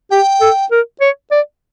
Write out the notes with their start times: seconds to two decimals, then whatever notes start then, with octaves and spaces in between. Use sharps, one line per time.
0.11 G4 G5
0.41 A4
0.71 A#4
1.00 C#5
1.31 D5